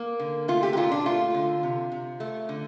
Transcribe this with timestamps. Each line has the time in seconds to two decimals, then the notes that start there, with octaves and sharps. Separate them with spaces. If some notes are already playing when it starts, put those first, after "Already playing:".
Already playing: A#3
0.20 D3
0.48 A3 F4
0.63 G4
0.73 G4
0.77 A#2 F4
0.91 D4
1.06 A3 F4
1.34 D3
1.63 C3
1.92 C3
2.20 A3
2.49 D3